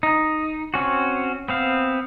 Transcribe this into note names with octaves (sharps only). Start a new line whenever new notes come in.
D#4
C4 C#4 F#4
B3 C4 F5